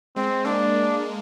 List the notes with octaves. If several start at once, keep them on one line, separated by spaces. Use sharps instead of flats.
G#3 C4
A#3 D4